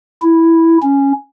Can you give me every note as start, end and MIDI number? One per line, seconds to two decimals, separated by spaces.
0.22 0.78 64
0.83 1.13 61